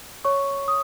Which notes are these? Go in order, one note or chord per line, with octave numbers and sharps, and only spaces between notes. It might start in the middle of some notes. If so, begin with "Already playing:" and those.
C#5 C#6
D#6